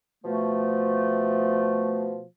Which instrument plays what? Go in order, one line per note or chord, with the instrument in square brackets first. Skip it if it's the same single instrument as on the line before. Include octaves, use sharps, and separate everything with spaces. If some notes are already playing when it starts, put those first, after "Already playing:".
[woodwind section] B2 F3 A3